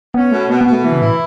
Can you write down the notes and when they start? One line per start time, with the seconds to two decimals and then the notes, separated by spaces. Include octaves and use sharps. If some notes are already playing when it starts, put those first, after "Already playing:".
0.14 B3 C#4
0.32 B2 A3
0.49 B2 B3
0.61 B3
0.66 B2
0.72 A3
0.84 E3 B3
0.92 C#3
1.01 A2 E4